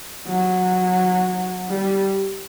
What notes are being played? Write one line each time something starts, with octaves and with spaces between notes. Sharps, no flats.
F#3
G3